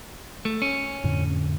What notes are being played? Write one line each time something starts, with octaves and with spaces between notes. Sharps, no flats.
A3
C#4
F2 A2 D3